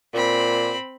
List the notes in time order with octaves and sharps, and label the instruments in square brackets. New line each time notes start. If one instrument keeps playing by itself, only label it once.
[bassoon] A#2 [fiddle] C4 B5